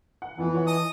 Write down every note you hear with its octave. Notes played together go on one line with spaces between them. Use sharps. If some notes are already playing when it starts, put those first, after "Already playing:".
F#5
F2 E3 F3 B3
F4 C#5 F#5
D#5 A5 D#6